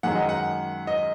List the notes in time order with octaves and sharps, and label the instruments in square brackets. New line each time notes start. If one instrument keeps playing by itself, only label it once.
[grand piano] F#2 D#3 G#3 F#5
D#5
F#5
D#5